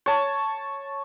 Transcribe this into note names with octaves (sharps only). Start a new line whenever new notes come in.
C#5 A5